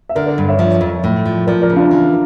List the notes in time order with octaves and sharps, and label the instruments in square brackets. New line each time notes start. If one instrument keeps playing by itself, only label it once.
[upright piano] E5
[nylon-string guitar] D3 [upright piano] A#4 D5
[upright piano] A#4 D5
[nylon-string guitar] G2
[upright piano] C#5 E5
[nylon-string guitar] F3 [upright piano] C#5 E5
[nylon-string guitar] F2
A2
F3
[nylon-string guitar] F3 [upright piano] A#4 D5
[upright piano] A#4 D5
[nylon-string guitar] C#3
[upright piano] D4 F4
[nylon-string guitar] E3